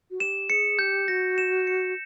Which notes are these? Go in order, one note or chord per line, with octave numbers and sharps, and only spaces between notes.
F#4
G4 E7
G#4 C#7
G4 G6
F#4 A#6
E7
C#7